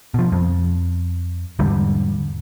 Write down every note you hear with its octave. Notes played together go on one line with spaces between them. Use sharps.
B2 F3
F2
E2 G#2 D3 G3